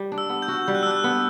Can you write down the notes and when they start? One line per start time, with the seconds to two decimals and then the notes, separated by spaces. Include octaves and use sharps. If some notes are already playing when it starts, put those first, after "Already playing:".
Already playing: G3
0.12 D4
0.18 E6
0.29 B3
0.42 G6
0.48 F#4
0.67 G3 G6
0.75 F#6
0.83 E6
0.86 D4 F#6
1.04 B3